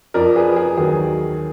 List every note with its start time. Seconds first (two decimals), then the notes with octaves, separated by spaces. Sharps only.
0.14 F2 F3 A#4 D5
0.36 G#4 B4
0.56 G#4
0.77 D#2 D#3 F#3 G#4